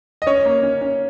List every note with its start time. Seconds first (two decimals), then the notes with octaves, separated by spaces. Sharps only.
0.22 D#5
0.27 C#4 C#5
0.46 A#3
0.63 C#4
0.81 C#4